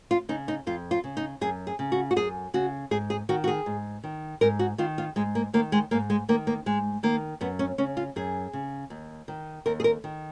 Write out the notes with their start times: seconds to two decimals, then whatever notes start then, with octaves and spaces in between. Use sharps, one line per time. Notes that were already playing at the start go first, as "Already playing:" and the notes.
0.11 F4
0.29 C#3 D#4
0.48 D#4
0.67 F2 F4
0.91 F4
1.04 C#3
1.17 D#4
1.41 F#2 G#4
1.67 G#4
1.79 C#3
1.92 F#4
2.11 F#4
2.16 F#2 G#4
2.54 C#3 F#4
2.91 G#2 G#4
3.10 G#4
3.29 D#3 F#4
3.44 F#4
3.48 G#4
3.66 G#2
4.04 D#3
4.41 G#2 A#4
4.59 F#4
4.78 D#3 F4
4.98 F4
5.16 G#2 G#3
5.35 A#3
5.53 D#3 A#3
5.72 G#3
5.91 G#2 A#3
6.10 G#3
6.29 D#3 A#3
6.47 A#3
6.66 G#2 G#3
7.03 D#3 A#3
7.41 F#2 B3
7.59 C#4
7.78 C#3 C#4
7.97 F4
8.16 F#2 G#4
8.53 C#3
8.90 D#2
9.28 D#3
9.66 D#2 A#4
9.80 G#4
9.84 A#4
10.04 D#3